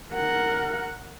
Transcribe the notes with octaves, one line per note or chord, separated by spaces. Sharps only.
A#4 F#5